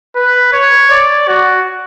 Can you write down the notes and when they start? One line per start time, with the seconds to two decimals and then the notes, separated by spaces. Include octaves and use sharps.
0.16 B4
0.53 C#5
0.91 D5
1.28 F#4